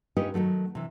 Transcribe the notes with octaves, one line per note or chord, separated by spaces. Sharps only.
C#4 D#4 F4 G4 B4 D#5
D#3 E3 F#3 A3
C3 E3